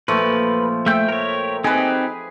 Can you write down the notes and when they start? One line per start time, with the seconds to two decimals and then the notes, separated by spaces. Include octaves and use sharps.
0.08 A#2 F3 A3 B4
0.86 A3 E5 G5 G6
1.09 A#4 C#5
1.64 C4 D#4 G4 G#4 B4